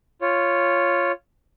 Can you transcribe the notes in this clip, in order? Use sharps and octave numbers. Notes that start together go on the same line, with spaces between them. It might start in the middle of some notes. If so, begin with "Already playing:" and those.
F4 C#5